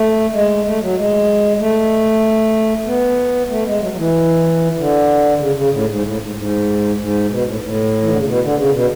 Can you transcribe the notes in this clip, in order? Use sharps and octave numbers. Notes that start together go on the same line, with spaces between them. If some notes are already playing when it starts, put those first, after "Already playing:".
Already playing: A3
G#3
A3
F#3
G#3
A3
B3
A3
G#3
F#3
F#3
E3
D3
C#3
C#3
A2
G#2
A2
G#2
G#2
G#2
B2
A2
A2
E3
D3
C#3
B2
D3
C#3
B2